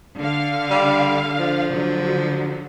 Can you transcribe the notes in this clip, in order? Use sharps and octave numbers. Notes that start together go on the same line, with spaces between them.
D3 F5
G3
F3
D3 F#3